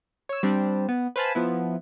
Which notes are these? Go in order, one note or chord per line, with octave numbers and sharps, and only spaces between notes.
C#5 E6
G3 C4 D4
B3
B4 C5 F5 G#5 A5 B5
F3 B3 E4